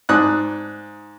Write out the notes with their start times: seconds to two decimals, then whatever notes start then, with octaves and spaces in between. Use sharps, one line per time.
0.09 G#2 D5 D#6 F#6